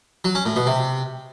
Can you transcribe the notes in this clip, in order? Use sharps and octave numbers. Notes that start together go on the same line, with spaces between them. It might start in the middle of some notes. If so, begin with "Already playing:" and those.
F#3
C#4
A2
B2
C3